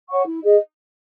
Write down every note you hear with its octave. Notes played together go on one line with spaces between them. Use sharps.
C#5 F#5 C#6
E4
G#4 D#5